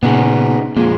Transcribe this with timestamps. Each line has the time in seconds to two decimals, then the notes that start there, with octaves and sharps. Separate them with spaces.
0.03 A#2 C#3 B3 D#4 G#4
0.77 F2 A#2 G#3 A#3